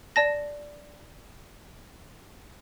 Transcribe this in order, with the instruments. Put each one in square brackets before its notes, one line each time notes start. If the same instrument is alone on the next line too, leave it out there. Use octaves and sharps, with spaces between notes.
[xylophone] D5 A5 A#6